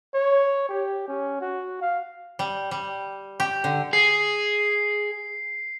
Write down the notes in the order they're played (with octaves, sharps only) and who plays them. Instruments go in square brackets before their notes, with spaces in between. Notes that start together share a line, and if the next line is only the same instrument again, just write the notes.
[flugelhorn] C#5
G4
C#4
F#4
F5
[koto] G3
G3
G4
D3
[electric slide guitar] G#4 [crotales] C7